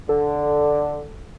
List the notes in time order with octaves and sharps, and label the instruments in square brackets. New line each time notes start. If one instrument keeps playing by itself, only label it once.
[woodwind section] D3 [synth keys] A4